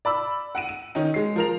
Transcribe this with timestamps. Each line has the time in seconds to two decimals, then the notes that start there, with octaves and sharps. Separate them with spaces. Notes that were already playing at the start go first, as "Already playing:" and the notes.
0.05 D5 B5 E6
0.55 F#5 D7 D#7
0.69 D#7
0.95 D#3 C#4 D#4
1.14 G#3 C7
1.36 F3 A#4 F7